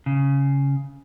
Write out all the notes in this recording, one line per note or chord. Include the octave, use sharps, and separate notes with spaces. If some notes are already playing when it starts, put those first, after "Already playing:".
C#3